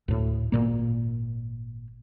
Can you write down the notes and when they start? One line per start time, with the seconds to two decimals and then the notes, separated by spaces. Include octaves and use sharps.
0.08 D2 A2
0.52 G#1 E2 A#2 A#3